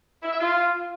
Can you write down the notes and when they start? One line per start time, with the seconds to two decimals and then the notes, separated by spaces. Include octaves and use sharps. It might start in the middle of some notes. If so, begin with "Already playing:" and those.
0.23 E4
0.32 E5
0.41 F4